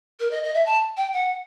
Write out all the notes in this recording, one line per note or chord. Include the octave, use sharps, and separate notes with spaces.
A#4
D#5
D#5
E5
A5
G5
F#5